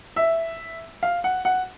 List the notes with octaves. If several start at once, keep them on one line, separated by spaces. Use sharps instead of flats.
E5
F5
F#5
F#5